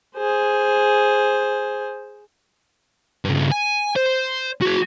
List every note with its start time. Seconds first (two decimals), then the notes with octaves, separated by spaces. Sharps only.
0.16 G#4 C5
3.25 G2 C#3
3.52 G#5
3.96 C5
4.62 F#4 G#4